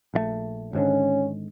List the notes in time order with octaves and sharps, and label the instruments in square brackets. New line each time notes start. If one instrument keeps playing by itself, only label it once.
[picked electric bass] A#1 D#3 A3
[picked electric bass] G#1 G#2 D3 [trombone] C#4